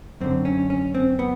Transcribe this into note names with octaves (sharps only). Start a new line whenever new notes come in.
F#2 D3 C4
C#4
C#4
C4
B3